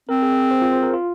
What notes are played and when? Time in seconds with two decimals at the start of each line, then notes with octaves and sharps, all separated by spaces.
0.09 C4 A#4
0.22 G#4
0.37 G#4
0.51 C5
0.62 F4
0.72 C5
0.83 A#4
0.94 F4